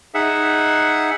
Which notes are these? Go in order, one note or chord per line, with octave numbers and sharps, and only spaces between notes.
D#4 G#4 E5 F#5